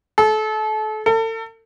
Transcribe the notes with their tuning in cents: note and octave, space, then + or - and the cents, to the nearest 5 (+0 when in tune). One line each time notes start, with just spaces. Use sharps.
A4 -30
A4 +40